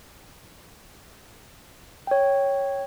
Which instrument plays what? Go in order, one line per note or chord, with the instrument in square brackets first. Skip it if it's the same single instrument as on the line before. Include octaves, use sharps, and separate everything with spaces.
[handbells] C#5 G5